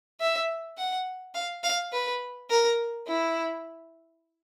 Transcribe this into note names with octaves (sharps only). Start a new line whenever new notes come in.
E5
F#5
F5
F5
B4
A#4
E4